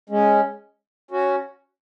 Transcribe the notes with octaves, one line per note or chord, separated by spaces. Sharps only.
G#3 C#4
C#4 F#4